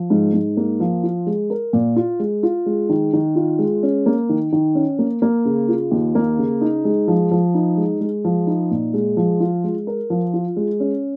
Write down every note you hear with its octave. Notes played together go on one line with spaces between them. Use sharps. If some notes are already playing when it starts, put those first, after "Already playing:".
Already playing: F3
G#2
G#2
A#3
F3
F4
G#3
A#4
A#2
F4
G#3
F4
G#3
D#3
D#3
F4
G#3
C#4
A#3
D#3
D#3
C#4
A#3
A#3
C#3
F4
D#2
A#3
C#3
D#4
G#3
F3
F3
D#4
G#3
G#3
F3
D#4
A#2
G#3
F3
F4
G#3
A#4
F3
F4
G#3
C#4